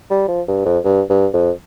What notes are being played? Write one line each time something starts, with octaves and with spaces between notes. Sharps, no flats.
G3
F3
G2
F2
G2
G2
F2